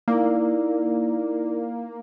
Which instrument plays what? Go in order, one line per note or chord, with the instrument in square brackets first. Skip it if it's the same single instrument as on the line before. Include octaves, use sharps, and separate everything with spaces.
[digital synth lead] A#3 [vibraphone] D#4 E4 D5